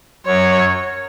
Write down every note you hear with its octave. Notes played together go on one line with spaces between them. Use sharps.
F#2 C#5